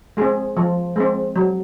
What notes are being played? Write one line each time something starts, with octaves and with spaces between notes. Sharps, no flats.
G#3 C4 G#4
F3
G#3 C4
F#3